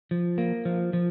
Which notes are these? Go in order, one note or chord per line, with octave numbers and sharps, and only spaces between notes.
F3
A#3
F3
F3